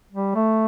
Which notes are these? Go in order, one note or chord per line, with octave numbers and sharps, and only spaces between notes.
G3
A3